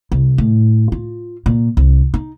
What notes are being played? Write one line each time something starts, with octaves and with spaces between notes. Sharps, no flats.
C2
A2
F4
A#2
C2
D#4